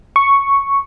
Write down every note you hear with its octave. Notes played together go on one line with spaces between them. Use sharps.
C#6